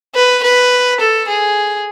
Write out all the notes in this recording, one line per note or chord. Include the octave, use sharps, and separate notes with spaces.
B4
B4
A4
G#4